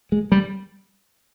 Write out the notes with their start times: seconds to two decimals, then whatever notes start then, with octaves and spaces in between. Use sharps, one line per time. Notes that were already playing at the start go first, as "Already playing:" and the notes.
0.12 G#3
0.32 G3